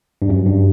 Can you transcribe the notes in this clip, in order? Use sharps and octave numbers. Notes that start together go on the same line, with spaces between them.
G2
F#2
G2